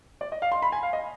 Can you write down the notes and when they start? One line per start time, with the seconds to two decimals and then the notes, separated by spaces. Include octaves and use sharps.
0.21 D5
0.32 D#5
0.42 F5
0.52 C6
0.62 B5
0.72 G#5
0.83 F5
0.93 D#5